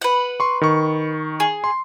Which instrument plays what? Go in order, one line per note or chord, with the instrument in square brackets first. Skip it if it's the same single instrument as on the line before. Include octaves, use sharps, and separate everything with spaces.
[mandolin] B4 F#5
[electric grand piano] C6 C#6
D#3 C#6
[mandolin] G#4
[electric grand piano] C6